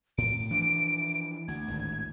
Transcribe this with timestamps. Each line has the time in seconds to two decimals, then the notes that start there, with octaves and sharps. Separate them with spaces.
0.18 A2 D7
0.51 E3 F3 D4
1.48 D2 G#6
1.68 G#1 D2 A2